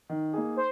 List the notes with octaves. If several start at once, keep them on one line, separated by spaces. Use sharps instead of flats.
D#3
A#3 D#4 G#4
C5